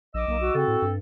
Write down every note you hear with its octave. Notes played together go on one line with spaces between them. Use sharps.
A#1 D#5 D6 E6
B1 A#3
F#4
C#3 C4 A4
A2
G2